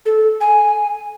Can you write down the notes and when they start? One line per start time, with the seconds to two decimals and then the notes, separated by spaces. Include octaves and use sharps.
0.06 A4
0.41 G#5